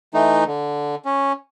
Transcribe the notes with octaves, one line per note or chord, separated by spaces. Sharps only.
E3 A3 D#4
D3
C#4